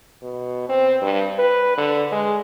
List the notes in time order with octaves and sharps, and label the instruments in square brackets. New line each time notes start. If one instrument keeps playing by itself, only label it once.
[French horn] B2
C4
G2
B4
D3
G#3